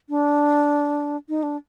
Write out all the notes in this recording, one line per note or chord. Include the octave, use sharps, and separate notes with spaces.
D4
D#4
D4